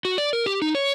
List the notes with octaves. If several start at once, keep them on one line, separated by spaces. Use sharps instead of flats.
F#4
D5
A#4
G4
D#4
C#5